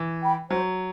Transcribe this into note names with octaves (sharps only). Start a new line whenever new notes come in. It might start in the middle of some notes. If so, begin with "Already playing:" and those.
Already playing: E3
G5 B5
F#3 C5